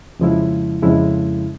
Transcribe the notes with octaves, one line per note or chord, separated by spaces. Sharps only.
F2 C#3 F3 G#3 E4
F2 C#3 F3 G#3 E4